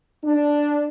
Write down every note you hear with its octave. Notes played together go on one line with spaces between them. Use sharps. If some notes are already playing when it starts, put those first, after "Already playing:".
D4